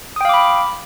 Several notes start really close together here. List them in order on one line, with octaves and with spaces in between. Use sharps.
D#6 G5 F5 D6 B5